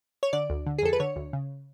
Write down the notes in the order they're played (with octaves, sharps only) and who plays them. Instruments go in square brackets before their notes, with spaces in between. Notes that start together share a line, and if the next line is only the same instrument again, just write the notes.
[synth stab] C#5
D3 D5
D2
D3
G#4
F2 A4
B4
D3 C#5
D2
C#3